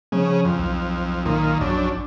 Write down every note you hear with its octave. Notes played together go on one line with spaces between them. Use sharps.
C#3 F3 G#4
F2
B1
A#2 D#3
A#1 F#2 D4